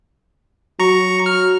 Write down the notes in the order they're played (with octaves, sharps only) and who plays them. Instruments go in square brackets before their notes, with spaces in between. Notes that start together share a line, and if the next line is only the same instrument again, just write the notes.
[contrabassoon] F#3 [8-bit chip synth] A#5 C#6
[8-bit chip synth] F6